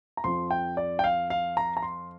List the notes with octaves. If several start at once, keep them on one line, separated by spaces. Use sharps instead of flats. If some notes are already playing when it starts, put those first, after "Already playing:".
A#5
F2 F3 C4 C6
G5
D5
G5
F5
F5
A#5
A#5
C6